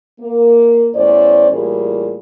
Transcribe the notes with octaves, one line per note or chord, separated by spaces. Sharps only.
A#3
E2 A2 C#4 C5 D5
A2 E3 G3 A#3 F4 G#4